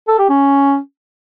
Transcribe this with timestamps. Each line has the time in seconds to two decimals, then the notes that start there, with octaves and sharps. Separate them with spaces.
0.08 A4
0.19 G4
0.29 C#4